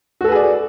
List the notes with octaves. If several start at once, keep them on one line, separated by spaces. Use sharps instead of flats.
F#4 G#4 A4 B4 D5